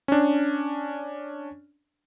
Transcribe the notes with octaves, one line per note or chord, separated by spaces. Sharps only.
C#4 D4